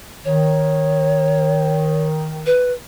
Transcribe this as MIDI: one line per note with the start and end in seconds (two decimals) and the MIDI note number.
0.25 2.50 51
0.25 2.07 73
2.46 2.72 71